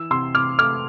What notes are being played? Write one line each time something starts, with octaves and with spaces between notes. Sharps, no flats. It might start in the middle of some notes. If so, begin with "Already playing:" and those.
Already playing: E3 E6
C3 C6 E6
C3 D6 F6
A3 D6 F6